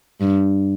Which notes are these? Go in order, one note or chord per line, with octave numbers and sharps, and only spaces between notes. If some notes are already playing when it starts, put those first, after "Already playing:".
G2